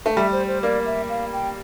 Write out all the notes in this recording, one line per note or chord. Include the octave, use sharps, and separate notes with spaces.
A3
G3 E5
C5
C5
A#3 D5
E5
F5
G5